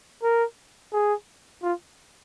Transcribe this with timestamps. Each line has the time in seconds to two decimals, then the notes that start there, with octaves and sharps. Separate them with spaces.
0.23 A#4
0.93 G#4
1.62 F4